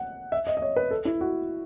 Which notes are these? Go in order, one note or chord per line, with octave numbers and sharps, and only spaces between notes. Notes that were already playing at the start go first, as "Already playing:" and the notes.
Already playing: F#5
E5
D#5
D#5
C#5
B4
A4
E4
F#4